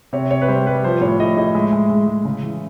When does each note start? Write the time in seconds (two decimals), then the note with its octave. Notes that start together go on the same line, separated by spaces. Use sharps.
0.13 C3 C#5
0.31 C3 C#5
0.42 B4
0.48 G3 C5
0.66 G3 B4
0.84 F3 C5
1.01 A2 C#5
1.20 A2 D#5
1.37 A2 D#5
1.54 G#3 E5
1.72 G#3
1.90 G#3
2.07 G#3
2.25 C#3
2.43 E3